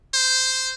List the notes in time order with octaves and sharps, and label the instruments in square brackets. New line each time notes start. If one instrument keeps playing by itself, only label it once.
[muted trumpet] C5